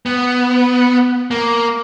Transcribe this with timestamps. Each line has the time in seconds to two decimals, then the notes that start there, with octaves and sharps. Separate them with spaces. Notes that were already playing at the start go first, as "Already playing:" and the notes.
0.06 B3
1.31 A#3